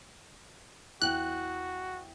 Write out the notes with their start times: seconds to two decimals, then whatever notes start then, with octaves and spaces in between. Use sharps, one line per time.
1.02 E2 F#4 G5 F#6